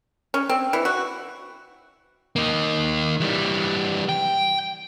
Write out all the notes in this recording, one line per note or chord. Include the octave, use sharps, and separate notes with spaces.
C#4
C4
E3
F#4
A#3 D#4
E3 G3
G5